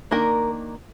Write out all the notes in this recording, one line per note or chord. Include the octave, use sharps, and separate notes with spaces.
D#3 A#3 D4 A#4